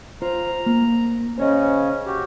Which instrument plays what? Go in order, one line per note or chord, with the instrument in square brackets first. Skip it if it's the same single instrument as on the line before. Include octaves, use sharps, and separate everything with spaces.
[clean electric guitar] F4 C5 [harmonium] A#5
[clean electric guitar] A#3
[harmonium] C#3 C#4 [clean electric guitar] C5 C#5 D#5
[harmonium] F#4 G4